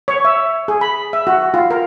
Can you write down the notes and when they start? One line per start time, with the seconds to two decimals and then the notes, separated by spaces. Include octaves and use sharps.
0.08 C#5
0.25 E5
0.68 G#4
0.81 B5
1.13 E5
1.27 F#4
1.54 F4
1.71 A#4